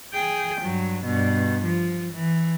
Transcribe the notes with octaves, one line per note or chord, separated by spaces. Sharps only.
G#4 G5
G2 F#3
G2 B2
F3
E3